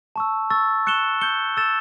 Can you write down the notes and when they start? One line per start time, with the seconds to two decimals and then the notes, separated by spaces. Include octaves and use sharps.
0.16 A5 C#6 E6
0.50 C#6 E6 A6
0.87 C#6 F#6 C#7 E7 G7
1.21 G6 C#7 G7
1.57 E6 A6 E7